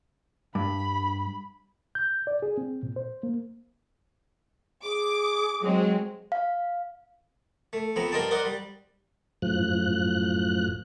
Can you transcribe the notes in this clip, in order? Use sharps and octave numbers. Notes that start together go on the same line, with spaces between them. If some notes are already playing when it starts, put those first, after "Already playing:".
G2 B5
G6
D5
G#4
C4
A#2
C5
A#3
G#4 D6
F#3 G#3 C4
F5
A3
F2 B3 C4 A#5
G2 A#4 C5 D#5 G5 A5
A#4 C5 D5 D#5 F#5
G3
F#2 A2 F3 F#6